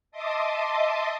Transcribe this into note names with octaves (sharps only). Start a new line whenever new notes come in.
D#5 E5 A5 C6 D6 D#6